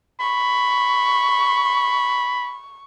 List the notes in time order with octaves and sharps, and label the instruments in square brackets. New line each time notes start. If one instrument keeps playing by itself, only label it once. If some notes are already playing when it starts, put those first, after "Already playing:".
[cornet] B5 [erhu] C#6